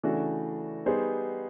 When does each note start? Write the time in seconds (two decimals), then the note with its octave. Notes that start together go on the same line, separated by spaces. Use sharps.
0.03 C#3 E3 A3 D4 F#4
0.86 G3 B3 D#4 G#4 C5